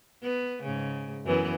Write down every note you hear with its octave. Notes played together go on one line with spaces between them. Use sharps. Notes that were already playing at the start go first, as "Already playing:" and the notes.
B3
G#2 C#3
F#2 E3 B3